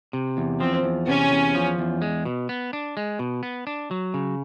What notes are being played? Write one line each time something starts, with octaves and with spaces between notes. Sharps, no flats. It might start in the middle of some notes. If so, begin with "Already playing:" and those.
C3
E2
F3 C4
E2
C3 C#4
E2
F3
E2
G#3
B2
B3
D4
G#3
B2
B3
D4
F#3
C#3